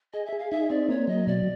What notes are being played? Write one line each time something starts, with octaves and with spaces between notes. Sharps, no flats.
G#4 D#5
E5
G#4
F5
D#4 E5
C4 D5
A#3 C#5
F#3 D#5
B2 D5